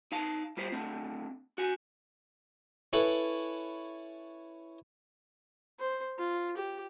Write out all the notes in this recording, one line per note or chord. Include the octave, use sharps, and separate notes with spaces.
D#4 F5 A5
G3 F4 G4 C5
D3 A3 C4
F#4 G#5
C#4 E4 A4 B4
C5
F4
G4